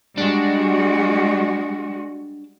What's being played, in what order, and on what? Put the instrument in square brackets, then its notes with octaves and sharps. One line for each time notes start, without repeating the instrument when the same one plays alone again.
[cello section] G3 G#3 F#4 [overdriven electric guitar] D4